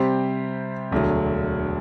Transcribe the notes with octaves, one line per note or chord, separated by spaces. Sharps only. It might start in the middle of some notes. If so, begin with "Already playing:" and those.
Already playing: C3 G3 C4 G4 C5
E1 D2 D3 F#3